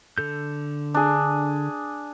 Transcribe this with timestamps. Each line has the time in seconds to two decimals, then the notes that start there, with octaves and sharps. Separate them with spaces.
0.18 D3 A4 G6
0.94 D4 G#4